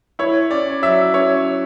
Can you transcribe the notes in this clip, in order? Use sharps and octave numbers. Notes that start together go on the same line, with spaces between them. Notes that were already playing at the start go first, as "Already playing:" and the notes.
E4 C#5
C#4 D5
F#3 E5
C#4 C#5